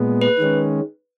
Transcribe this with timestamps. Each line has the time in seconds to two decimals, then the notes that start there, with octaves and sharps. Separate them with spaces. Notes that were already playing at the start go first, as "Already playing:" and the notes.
Already playing: A#2 G#3 B3
0.22 B4
0.39 D#3 G#3 C#4